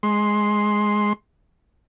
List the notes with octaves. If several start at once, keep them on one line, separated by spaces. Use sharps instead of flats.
G#3 C6